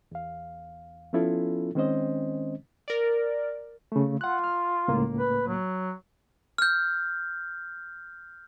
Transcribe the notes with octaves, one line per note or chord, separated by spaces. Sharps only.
E2 F5
F3 B3 C#4 E4 F4 A4
D#3 G#3 C4 C#4 C5 D#5
A#4 D5
C#3 A3
F4 F#5 F#6
F6
C#2 A2 A#3
B4
F#3
F6 G6